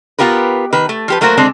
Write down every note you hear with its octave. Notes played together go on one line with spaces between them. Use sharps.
B3 F4 G4 A#4 B4
D#3 B4
A3
F3 G4 B4
F#3 A3 A#3 F#4 A#4 C5
D3 G#3 C4 D4